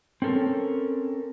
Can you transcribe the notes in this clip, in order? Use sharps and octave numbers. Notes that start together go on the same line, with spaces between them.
C4 C#4 A4 A#4